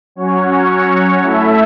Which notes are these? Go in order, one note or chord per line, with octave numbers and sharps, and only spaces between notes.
F#3 C#4 F#4 C#5
A3 E4 A4 E5